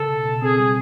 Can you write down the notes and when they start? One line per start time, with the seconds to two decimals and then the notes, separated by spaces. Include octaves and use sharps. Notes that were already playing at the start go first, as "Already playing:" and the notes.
Already playing: C#3 A4
0.08 B2
0.25 B2
0.42 C4 G#4
0.59 G3